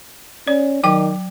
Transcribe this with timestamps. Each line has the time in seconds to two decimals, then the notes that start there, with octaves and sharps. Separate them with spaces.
0.47 C#4 D5
0.84 D#3 F#3 G5 D6